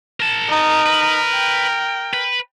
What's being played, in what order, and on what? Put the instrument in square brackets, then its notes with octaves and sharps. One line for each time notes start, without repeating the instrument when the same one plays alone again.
[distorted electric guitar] A#4 A5
[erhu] D#4
[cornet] A#4 [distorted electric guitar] B4
[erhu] G5
[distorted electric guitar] B4